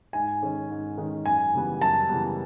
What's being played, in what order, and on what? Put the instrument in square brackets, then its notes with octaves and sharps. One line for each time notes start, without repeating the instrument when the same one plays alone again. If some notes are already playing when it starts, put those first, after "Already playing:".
[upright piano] G#2 [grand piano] G#5
[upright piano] D#3 G#3 C#4
G#2
D#3 G#3 C#4
[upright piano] F#2 [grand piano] G#5
[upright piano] C#3 E3 G3 B3
[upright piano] F#2 [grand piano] A5
[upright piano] C#3 E3 G3 B3